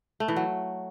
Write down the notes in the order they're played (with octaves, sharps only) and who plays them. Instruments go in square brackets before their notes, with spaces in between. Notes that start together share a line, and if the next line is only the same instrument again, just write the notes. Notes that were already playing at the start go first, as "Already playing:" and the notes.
[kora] A3
E3
F#3